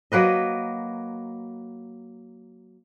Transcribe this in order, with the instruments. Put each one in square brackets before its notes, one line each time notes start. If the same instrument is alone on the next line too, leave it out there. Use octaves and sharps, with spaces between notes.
[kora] F#3 A#3 B4 D#5